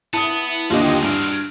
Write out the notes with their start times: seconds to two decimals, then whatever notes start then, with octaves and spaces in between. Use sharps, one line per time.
0.13 B3 E4 A5 D#6
0.70 D#2 D3 F#3 G#3 F4 G4 D#5
1.03 G2 F6 D7